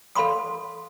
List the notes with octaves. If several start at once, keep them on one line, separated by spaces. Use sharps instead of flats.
A4 F5 B5 C6 D#6